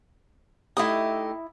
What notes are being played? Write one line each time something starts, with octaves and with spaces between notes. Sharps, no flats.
A3 D#4 E4 G4 D#6